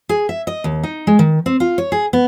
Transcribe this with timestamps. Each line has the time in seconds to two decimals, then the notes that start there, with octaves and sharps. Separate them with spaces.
0.09 G#4
0.29 E5
0.47 D#5
0.64 D#2
0.83 D#4
1.07 G#3
1.19 D#3
1.46 C4
1.60 F4
1.78 C#5
1.92 G#4
2.13 B3